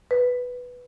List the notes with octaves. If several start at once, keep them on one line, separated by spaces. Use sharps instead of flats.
B4